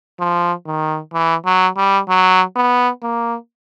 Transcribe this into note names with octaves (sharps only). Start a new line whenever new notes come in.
F3
D#3
E3
F#3
G3
F#3
B3
A#3